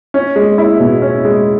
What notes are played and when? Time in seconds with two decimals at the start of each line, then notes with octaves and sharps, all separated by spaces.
0.14 C#4
0.36 G#3
0.58 E4
0.80 B2
1.02 C#4
1.25 G#3